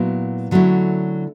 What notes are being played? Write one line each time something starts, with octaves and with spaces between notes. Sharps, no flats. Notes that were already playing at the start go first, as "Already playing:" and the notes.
Already playing: A#2 F#3 B3 E4
D3 F#3 A3 C#4 E4